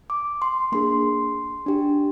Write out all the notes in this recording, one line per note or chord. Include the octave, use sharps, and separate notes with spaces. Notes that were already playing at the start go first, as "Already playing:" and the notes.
D6
C6
A#3 D4 G#4 C6
D4 G4